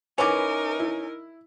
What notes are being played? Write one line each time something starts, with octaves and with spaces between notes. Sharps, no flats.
E3 C#4 D#4 A#4 B4 D6
E4